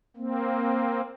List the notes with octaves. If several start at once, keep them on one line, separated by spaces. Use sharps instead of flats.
A#3 C4